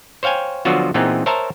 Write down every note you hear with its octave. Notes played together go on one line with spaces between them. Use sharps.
C5 C#5 F5 G5 G#5
D3 F3 F#3 B3 F4 F#4
A#2 E3 B3 C4 D#4 G#4
A#4 C5 C#5 E5 A5 A#5